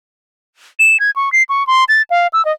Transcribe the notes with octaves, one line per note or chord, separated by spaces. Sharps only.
E7
G#6
C#6
C7
C#6
C6
A6
F5
E6
D#5